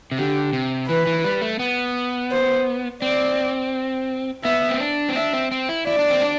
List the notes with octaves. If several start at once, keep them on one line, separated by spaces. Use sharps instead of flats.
C3
D3 G4
C3
E3 B4
E3
G3
A3
B3
C5
C4 D5
B3 E5
C4
D4
C4
D4 E5
C4
C4
E4
E4 D5
D4
C4
D4